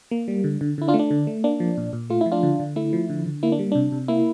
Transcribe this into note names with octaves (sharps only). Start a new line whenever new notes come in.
A#3
G3
D3
D3
D3 E4
D4 F4
A3
D4
D3
A3
A#3 D4
F3
A#2
A#2
A3 F4
E4
F3
D4 F4
D3
D3
A3 E4
F3
D3
D3
A#3 E4
D4
G3
C3 D4
C3
A#3 E4